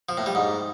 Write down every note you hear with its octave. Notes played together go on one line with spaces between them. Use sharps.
F3
A2
G3
G#2